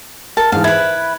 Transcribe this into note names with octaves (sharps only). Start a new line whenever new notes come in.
A#4 A5
G#2 E3 F5
E4 B4 G#6